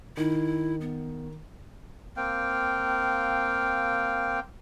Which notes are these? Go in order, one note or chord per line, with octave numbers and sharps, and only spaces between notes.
D#3 E4
B3
A#3 C4 F5 G5